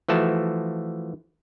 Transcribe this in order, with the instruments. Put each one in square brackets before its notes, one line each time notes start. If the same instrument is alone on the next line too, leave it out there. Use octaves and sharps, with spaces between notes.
[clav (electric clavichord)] E3 F3 A3 F#4 A5